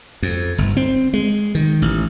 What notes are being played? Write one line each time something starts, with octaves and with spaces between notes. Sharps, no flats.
F2
G1
C4
G#3
D#3
A1